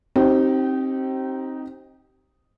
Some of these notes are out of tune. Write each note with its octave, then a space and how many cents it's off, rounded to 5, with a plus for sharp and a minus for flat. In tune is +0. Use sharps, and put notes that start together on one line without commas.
C4 +20 D#4 +0 G4 -25